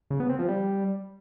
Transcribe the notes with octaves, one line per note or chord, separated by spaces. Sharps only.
C#3
B3
C4
F3
G3